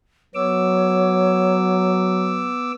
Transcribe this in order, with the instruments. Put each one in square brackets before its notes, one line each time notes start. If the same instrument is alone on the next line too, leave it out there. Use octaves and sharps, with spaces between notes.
[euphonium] F#3 [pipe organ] B3 D6 E6 [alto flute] C#5